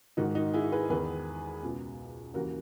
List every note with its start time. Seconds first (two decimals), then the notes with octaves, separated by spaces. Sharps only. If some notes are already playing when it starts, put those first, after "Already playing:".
0.17 G#2 D#3 D#4 F#4
0.35 D#4 F#4
0.54 E4 G#4
0.72 G#4 B4
0.90 E2 D#3 G#4 B4
1.63 C#2 B2
2.34 D#2 C#3 E3 F#4 A#4